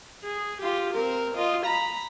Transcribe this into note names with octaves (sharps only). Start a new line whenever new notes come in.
G#4
F4 G4
C4 A#4
F4 D#5
A#5 B5